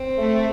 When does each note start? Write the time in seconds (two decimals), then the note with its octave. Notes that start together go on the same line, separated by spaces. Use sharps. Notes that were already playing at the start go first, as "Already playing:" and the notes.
Already playing: C4
0.17 A3